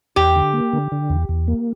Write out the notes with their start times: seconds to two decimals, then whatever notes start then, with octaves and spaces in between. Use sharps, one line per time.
0.16 E2 G4
0.36 D3
0.53 A#3
0.73 D3
0.92 D3
1.10 E2
1.29 E2
1.48 A#3